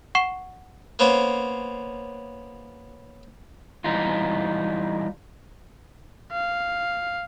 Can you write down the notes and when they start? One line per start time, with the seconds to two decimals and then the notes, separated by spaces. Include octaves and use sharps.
0.15 F#5 C#6 C7 E7 G7
0.99 A#3 B3 C#4 C5
3.84 E3 G3 D#4 F4
6.32 F5